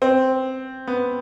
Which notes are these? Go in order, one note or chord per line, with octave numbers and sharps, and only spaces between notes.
C4
B3